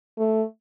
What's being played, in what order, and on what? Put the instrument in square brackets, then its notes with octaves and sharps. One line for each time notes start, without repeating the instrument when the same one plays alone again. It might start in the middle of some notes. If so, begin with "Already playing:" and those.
[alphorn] A3